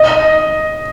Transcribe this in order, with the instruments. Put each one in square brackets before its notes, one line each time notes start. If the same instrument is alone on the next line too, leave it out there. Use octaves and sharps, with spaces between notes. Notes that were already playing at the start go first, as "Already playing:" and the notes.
Already playing: [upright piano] D#5